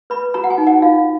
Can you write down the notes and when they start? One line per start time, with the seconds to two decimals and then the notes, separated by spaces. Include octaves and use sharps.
0.10 B4 B5
0.34 F#4 A#5
0.44 F#5
0.50 G#5
0.58 D#4
0.67 F#5
0.82 F4 F5